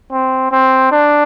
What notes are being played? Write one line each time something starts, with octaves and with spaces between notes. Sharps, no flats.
C4
C4
D4